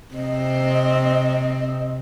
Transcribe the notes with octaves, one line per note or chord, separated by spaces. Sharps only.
C3 C4 D#5